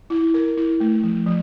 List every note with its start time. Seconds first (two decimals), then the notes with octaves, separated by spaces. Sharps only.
0.10 E4
0.34 A#4
0.57 E4
0.80 A3
1.03 F3
1.27 F3